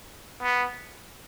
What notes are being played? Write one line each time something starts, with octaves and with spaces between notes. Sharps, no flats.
B3